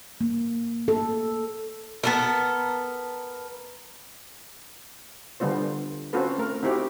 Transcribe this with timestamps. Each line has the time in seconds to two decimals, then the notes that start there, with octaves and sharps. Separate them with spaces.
0.21 A#3
0.88 A4
2.04 B3 A4 A#4
5.40 D3 G3 B3 F4 C5
6.13 C4 C#4 F4 F#4 A4 B4
6.38 A3 A#4
6.63 C4 D#4 E4 F#4 G4